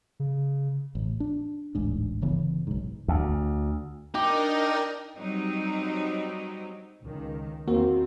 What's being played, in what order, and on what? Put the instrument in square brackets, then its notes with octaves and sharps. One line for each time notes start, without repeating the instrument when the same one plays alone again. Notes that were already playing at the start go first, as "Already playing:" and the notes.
[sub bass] C#3
[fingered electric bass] A1
D4
D1 A1 G#2 D4
G1 C#3 E3 B3
B1 G#2
[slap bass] D2
[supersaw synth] D4 A#4 D#5 [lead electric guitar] D#4 [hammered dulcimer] G4
[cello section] F#3 G3 C4 D#4
[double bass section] C#2 D#3
[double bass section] E2 D#3 C4 [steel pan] A#3 [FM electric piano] F#4